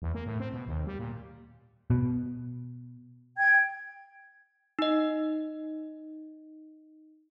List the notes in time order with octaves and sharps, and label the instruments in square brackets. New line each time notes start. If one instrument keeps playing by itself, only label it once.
[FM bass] E2
A#3
A2
C4
B2
D#2
G3
A#2
[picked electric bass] B2
[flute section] G5 G#6
[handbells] D#4 D#5